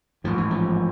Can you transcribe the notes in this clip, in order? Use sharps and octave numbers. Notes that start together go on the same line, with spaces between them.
A1 G#2 F3
E3
F3